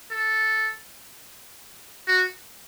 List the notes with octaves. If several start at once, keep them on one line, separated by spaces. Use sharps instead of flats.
A4
F#4